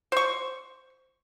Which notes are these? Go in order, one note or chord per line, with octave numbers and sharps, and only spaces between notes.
C5 C#6